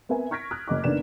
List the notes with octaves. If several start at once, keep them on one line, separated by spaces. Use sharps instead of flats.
B3 C4 A#4 E5 G#5
C#6 F6 G#6 A#6 B6 D7
D#6 F6 F#6
F#1 D#5 D6
F#1 D3 D#3 B3 D5 E7